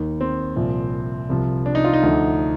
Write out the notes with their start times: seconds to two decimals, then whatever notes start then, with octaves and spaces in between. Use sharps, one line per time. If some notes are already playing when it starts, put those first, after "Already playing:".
Already playing: D#2 D#3 D#4
0.21 C4
0.56 C2 A#2 F3
1.30 C2 C3 F3
1.66 D4
1.75 D#4
1.85 F4
1.93 D#4
2.03 D2 D3 F3